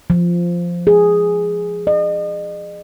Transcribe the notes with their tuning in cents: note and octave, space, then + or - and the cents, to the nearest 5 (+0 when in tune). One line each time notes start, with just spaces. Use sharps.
F3 -5
G#4 -5
D#5 -40